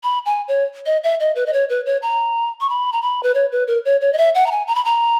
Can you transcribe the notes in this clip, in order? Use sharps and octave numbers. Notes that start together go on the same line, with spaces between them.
B5
G#5
C#5
D#5
E5
D#5
B4
D#5
C#5
B4
C#5
A#5
C#6
B5
A#5
B5
B4
C#5
B4
A#4
C#5
C#5
D#5
E5
F#5
A#5
G#5
A#5
B5
A#5